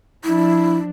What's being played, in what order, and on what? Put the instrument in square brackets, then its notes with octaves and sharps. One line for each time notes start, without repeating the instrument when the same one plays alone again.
[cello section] F3 D4 [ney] E4